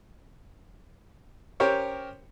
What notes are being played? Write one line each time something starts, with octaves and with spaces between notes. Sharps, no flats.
C#4 G4 A#4 C5 C#5